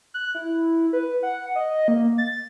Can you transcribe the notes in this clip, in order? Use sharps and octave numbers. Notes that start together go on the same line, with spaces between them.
F#6
E4
B4
F#5
D#5
A#3
A6